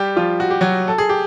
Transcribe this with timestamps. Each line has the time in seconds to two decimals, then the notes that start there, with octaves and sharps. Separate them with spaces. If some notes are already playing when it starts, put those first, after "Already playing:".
Already playing: G3 G4
0.16 F3 F4
0.40 F#4
0.50 G4
0.61 F#3 F#4
0.88 A4
0.98 G#4
1.09 G4